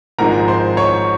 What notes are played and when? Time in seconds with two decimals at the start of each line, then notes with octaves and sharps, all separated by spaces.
0.19 G#1 G#2 F3 G#3 C4 A#4 A#5
0.48 C5 C6
0.77 C#5 C#6